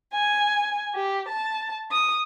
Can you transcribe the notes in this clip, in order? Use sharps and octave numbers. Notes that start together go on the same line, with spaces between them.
G#5
G4
A5
D#6